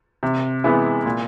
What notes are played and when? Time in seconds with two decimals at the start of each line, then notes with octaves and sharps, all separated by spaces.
0.23 C3
0.64 E3 G#3 B3 E4
1.06 A#2